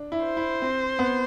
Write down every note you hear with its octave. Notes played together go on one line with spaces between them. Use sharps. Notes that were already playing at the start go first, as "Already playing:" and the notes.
Already playing: D4
E4
C5
E4
C4
B3